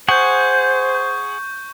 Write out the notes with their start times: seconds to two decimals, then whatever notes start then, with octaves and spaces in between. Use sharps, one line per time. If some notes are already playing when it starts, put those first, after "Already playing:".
0.08 G#4 C5 F#5 C#6 G6